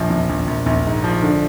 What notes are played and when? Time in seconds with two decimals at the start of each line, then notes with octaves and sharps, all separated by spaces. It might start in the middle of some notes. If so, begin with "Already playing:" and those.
Already playing: A#1 F3
0.10 A#1
0.29 A#1
0.48 A#1
0.66 A#1
0.86 G#2
1.04 F3
1.23 D3